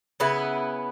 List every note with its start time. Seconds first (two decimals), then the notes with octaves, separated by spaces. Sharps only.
0.20 C#3 B3 E4